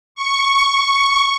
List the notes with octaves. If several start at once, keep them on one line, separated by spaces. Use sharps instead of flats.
C#6